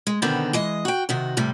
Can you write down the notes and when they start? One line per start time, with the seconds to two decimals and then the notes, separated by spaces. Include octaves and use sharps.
0.07 G#3
0.22 B2 D3 D#3 B3 C4
0.53 E3 G#3 D#5
0.85 F#4 G5
1.09 C3 D#3 F#4
1.37 A2 C3 G3